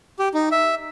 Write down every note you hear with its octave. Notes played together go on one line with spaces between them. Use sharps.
G4
D#4
E5